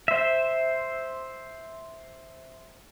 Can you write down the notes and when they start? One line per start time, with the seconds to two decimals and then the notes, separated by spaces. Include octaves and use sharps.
0.08 C5 E5